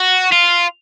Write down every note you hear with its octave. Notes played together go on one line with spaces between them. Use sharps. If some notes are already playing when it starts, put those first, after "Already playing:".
Already playing: F#4
F4